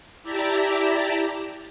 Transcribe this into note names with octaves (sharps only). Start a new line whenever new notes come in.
E4 G4 D5 E5 A5 A#5